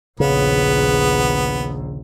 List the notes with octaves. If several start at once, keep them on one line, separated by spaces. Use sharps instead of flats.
A#1 D#2 C#3 B3